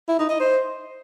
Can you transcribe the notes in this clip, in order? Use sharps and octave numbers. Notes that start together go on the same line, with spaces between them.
E4
D#4
D#5
C5